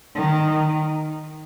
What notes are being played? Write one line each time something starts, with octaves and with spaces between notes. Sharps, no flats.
D#3